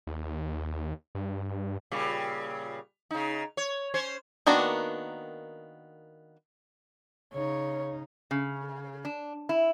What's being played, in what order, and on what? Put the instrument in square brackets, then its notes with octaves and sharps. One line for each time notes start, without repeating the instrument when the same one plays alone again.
[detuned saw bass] D#2
G2
[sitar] A#2 C#3 G3
C#3 D#4
C#5
C#4 C5 C#5
[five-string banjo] D#3 A#3 B3 D4 F#4
[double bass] C#3 D#4 [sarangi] C#5
[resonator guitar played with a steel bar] C#3
D4
E4